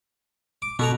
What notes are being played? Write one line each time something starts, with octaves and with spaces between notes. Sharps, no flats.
D6
B2 F#4 A4 A#5